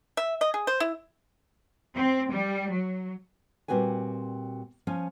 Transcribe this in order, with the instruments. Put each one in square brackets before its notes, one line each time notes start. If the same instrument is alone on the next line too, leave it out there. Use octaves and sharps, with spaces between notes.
[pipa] E5
D#5
G#4
C5
E4
[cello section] C4
G3
F#3
[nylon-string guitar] A#2 G3 C4 F#4 B4 G#5
F3 C#4 G#5